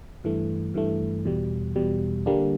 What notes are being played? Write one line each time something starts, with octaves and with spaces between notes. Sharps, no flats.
G2 E3 A3
G2 E3 A3
E2 B2 G3
E2 B2 G3
D3 G3 A#3 D4